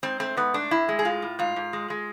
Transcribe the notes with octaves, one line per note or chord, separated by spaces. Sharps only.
G#2 C4
A3 C4
G#2 B3
A3 D4
A2 E4
G#3
G#4
A2 F4
A2
G#2 F4
G#2
G#3
G#3